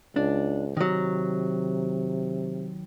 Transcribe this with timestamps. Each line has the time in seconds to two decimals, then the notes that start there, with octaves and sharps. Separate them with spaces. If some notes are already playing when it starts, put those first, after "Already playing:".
0.16 C#2 D4
0.77 C3 D#3 F#3